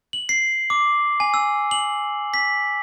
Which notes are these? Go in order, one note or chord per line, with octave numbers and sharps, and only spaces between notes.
F#7
C7
D6
G#5
E6
F#7
B6